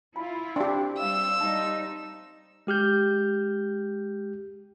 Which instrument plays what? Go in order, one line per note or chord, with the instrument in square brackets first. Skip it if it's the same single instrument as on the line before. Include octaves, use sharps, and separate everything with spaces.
[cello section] E4 F4 [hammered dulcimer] B5
[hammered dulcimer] C4 [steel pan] D4 G4
[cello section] G3 [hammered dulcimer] F5 [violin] E6
[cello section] G3 D#4 [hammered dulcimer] A5
[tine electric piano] G#3 G4 F6 G6